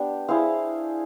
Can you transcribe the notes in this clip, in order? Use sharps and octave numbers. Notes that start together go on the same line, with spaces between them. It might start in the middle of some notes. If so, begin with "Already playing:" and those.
Already playing: B3 D4 G4
E4 G#4 C5 F5